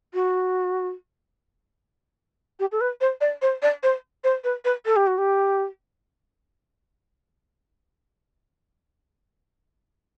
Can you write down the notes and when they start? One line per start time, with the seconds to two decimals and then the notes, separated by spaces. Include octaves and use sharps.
0.14 F#4
2.60 G4
2.72 A4
2.81 B4
3.01 C5
3.21 D5
3.42 C5
3.62 D5
3.83 C5
4.24 C5
4.44 B4
4.65 B4
4.86 A4
4.96 G4
5.07 F#4
5.18 G4